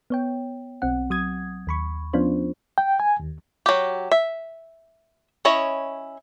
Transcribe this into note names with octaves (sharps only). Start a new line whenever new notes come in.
B3 C#5 G5
B1 C4 F#5
F#3 D#6 G#6
D#2 B5 C#6
F3 B3 C#4 D4 F4 C5
G5
G#5
D#2
F#3 G4
E5
C#4 E4 C#5 D#5